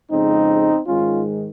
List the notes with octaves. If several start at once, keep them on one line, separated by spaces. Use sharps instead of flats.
F2 C#3 G#3 C4 D#4
G#2 D#3 G#3 C#4 F4